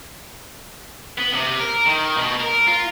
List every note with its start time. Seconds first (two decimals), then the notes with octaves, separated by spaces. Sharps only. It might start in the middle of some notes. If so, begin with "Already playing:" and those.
1.18 B3
1.34 C3
1.59 A#4
1.86 D#3
2.17 B2
2.40 A#4
2.67 F4